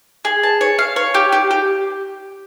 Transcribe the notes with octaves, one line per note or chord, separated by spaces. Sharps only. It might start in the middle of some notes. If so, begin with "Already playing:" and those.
G#4
A5
C#5
F5
C#5
G4
G4
G4